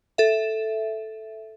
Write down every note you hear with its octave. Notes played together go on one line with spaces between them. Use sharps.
A4 E5